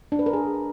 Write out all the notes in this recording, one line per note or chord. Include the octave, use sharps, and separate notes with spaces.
D4
B4
A#4
G#4